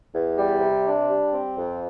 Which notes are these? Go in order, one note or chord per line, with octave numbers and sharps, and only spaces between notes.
E2
G3
C3
D4
G3
C4
F2